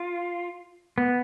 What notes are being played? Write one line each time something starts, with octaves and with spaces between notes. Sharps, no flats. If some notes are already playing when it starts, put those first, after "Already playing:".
Already playing: F4
B3